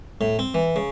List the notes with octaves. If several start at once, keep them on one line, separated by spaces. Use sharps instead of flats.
A2
C4
E3
C#3